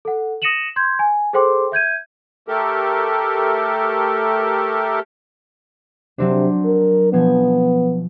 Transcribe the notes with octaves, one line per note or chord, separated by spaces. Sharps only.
A4 F#5
D#6 A#6 C#7 D#7 E7 F#7
C6 G6 G#6
G#5
G#4 A4 C5 G5 C6 D6
E5 G6 G#6 D#7
A3 G4 A4 A#4
C3 F#3 C4 D4
A#4
B2 F3 B3 G#5